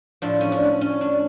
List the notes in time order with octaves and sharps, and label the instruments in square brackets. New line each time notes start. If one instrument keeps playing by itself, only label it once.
[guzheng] A2 F3 D4
C#4
D4
C#4
D4